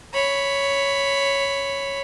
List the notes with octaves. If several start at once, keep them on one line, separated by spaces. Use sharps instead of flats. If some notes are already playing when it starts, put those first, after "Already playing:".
C#5 B5